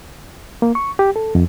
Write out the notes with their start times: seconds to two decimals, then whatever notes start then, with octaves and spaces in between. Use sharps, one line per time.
0.62 A#3
0.75 C#6
0.99 G4
1.16 A4
1.35 F2